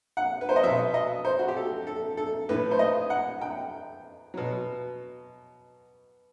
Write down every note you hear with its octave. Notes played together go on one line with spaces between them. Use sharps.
F#5
B4
C5
D#5
B2 F#3 E5
D#5
C5
F#4
G4
A4
A4
A4
A2 E3 B4
C5
D#5
F#5
G5
B2 F#3